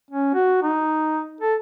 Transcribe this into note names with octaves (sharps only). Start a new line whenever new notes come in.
C#4
F#4
D#4
A4